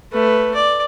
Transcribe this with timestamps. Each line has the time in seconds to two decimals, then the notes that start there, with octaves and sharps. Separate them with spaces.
0.13 A3 B4
0.55 D5